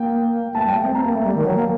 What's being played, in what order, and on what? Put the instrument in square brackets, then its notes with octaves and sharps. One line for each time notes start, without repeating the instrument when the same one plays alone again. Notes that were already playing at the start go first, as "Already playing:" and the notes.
Already playing: [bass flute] A#3 [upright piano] G5
[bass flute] A3 [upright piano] A5
[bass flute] G3 [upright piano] G5
[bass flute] A3
C4
[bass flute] C4 [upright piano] A#5
[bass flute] A#3
A3
G3
D#3
F#3
A#3